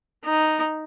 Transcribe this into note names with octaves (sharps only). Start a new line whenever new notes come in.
D#4